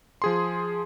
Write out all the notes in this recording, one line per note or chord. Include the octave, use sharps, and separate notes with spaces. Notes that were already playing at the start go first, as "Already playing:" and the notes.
F3 G#4 C6